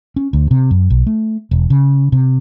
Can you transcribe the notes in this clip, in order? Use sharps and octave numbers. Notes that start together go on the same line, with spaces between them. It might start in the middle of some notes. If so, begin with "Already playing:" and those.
C#4
D2
C3
F#2
B1
A3
E1
C#3
C3